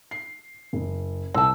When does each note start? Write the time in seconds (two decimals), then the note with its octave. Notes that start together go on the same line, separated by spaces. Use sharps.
0.11 C7
0.73 F#1
1.34 C2 C4 A5 E6